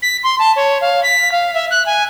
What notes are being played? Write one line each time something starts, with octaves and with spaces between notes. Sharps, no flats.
B6
C6
A5
C#5
F5
B6
F5
E5
F#6
G#5